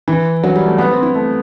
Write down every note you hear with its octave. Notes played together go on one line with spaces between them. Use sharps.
E3
F#3
G3
A3
B3
C4
E4
A3